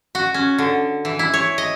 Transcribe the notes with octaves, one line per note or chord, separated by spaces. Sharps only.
F#4
C#4
D3
E3
E4
C#5
D#5